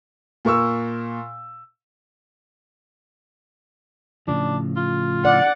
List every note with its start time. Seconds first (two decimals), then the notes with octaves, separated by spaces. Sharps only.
0.45 A#2 A#4 C#6 E6
4.28 A2 C#3 F3 D4
4.76 F4
5.25 D5 F#5